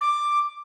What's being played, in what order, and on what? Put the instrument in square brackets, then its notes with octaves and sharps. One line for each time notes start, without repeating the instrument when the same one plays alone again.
[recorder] D6